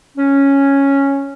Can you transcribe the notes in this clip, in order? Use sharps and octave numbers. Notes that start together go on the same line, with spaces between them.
C#4